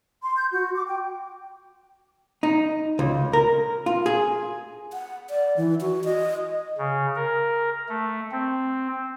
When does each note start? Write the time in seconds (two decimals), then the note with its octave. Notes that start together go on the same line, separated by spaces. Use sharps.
0.23 C6
0.35 G6
0.51 F#4
0.74 D6
0.87 G5
2.43 D#4
2.99 C#2
3.33 A#4
3.86 F4
4.06 G#4
4.93 F#5
5.30 D5
5.57 E3
5.81 F#4
6.04 D#5
6.78 C#3
7.16 A#4
7.89 A3
8.32 C4